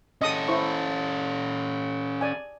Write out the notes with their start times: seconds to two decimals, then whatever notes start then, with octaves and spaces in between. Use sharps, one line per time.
0.21 C#4 A4 D#5 D#6
0.48 E4 C5 C#6
2.21 D5 G#5